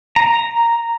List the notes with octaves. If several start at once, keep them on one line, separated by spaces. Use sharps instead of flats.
A#5